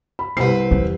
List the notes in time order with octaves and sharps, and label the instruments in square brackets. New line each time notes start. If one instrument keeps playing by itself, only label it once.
[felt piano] B5
[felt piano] C2 C3 C7 [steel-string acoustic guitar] C4 B4
[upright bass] E2